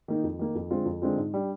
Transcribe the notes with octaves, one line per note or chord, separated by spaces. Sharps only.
D#3 A#3 D#4
F2
D#3 A#3 D#4
F2
D3 G#3 C4 F4
F2
D3 G#3 C4 F4
G#2
G3 D4